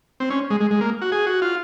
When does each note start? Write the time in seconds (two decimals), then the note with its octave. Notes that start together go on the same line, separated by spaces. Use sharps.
0.20 C4
0.30 C#4
0.50 G#3
0.60 G#3
0.71 G#3
0.81 A#3
1.02 F#4
1.12 G#4
1.26 F#4
1.42 F4